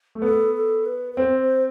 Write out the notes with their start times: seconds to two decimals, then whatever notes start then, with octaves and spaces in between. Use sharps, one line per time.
0.15 A3
0.22 B3 A4
0.54 A4
0.85 B4
1.12 B4
1.17 C4 C5
1.41 C5